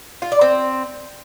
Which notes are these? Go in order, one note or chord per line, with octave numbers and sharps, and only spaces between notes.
F4
D5
C4